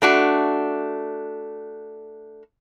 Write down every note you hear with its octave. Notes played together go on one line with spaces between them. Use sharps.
A3 D4 F#4